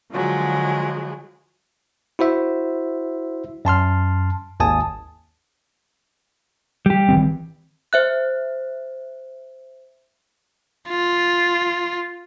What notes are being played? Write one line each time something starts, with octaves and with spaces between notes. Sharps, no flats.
D3 F3 F#3 G#3
E4 F#4 C5 E5
F#2 A5 C6 F6
G#1 D#2 G#5 A5 D#6
G3 G4
D#3 E3 C4
C5 E5 F#6
F4